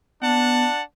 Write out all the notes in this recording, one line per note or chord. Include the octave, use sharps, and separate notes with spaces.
B3 D4 F#5 A5